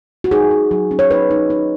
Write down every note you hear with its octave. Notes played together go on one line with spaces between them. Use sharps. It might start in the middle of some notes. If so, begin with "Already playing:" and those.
F#4
D#4 G#4
D#4
F#3
C#4
C#5
D#4 B4
D#4
D#4